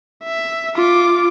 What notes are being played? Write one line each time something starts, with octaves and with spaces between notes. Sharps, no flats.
E5
F4 D6